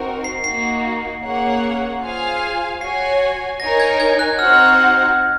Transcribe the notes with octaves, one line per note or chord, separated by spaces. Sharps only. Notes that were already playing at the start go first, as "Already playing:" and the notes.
Already playing: C4 D#4 F#4 A#4
C7
A#3 D#4 F#4 C7
A#3 C#4 G#4 C#5 F#5
F4 G#4 C5 F5 G#5
F#4 C#5 G#5 C7
D#4 A#4 C#5 G#5 A#6
G#6
G#6
F#6
C4 D#4 F#4 C5 F#5 F6